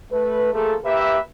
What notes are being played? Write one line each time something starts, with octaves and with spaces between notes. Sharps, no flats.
A3 B4
F3 A3 A#3 G#4 A4
A#3 G4 B4 E5